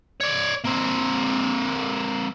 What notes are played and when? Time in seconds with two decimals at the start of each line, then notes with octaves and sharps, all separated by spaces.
0.20 C#5 D5
0.64 A#3 C4